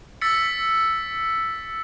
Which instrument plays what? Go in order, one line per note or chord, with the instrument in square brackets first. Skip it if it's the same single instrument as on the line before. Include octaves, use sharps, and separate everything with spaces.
[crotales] E6 A6 B6 C#7